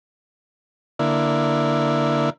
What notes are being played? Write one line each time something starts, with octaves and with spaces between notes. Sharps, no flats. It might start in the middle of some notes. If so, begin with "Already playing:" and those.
D3 A#3 E4